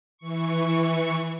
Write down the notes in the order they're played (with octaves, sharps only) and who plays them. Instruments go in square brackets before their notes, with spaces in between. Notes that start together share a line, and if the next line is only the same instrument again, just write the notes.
[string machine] E3 C#6